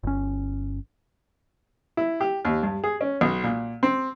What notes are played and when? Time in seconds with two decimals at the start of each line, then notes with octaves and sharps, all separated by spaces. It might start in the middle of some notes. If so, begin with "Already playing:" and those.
0.03 G1 C#4
1.97 E4
2.21 G4
2.45 D#2
2.63 G2
2.84 G#4
3.01 C#4
3.21 B1
3.43 A#2
3.83 C4